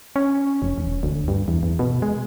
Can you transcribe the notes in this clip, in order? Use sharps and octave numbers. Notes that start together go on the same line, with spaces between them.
C#4
F1
E1
D2
G2
E2
E2
B2
G#3